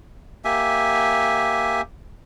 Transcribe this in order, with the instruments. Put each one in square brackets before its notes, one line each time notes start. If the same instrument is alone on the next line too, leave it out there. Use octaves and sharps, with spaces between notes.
[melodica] A#3 G4 E5 G#5